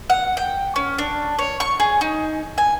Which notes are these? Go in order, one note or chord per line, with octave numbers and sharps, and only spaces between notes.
F#5
G5
C#4
D4
C#5
C#6
G#4
D#4
G#5